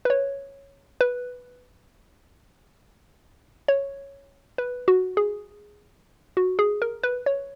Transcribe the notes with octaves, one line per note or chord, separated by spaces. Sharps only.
B4
C#5
B4
C#5
B4
F#4
G#4
F#4
G#4
A#4
B4
C#5